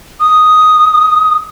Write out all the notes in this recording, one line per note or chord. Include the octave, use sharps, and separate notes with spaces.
D#6